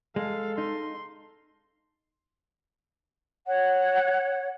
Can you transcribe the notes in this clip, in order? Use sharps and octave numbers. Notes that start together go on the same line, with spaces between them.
G#3 A4 F5
D#4 C6
C#5 F#5